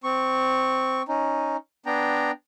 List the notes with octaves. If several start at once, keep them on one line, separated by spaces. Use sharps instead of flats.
C4 C#6
C#4 D#4
B3 D4 G5 A#5